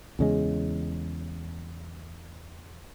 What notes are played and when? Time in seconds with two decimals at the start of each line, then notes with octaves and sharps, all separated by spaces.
0.19 E2 C#3 G#3